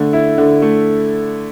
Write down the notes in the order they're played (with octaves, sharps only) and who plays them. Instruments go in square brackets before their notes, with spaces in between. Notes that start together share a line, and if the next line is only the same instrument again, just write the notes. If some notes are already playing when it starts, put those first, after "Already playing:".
Already playing: [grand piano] D3 A3
E4
D3
A3